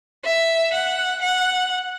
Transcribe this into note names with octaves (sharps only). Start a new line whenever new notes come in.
E5
F#5
F#5